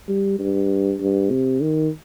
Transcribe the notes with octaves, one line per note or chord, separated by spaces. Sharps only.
G3
G2
G2
C3
D#3